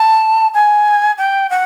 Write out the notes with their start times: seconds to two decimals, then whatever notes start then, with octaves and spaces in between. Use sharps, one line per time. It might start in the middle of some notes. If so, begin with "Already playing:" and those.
Already playing: A5
0.54 G#5
1.18 G5
1.50 F#5